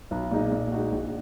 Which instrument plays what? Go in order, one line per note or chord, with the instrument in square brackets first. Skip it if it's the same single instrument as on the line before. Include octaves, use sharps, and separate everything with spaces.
[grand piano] B1
A#2 G#3 D#4
A#2
G#3 D#4 F#4
A#1